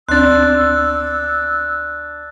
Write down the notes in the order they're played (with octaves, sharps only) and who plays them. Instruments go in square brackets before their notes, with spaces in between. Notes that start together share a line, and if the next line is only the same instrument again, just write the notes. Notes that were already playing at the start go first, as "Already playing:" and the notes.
[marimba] D2 C4 [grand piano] D4 C6 [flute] E6 [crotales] F#6 A6